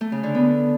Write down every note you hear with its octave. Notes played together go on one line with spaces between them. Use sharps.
A3
C#3
D3
B3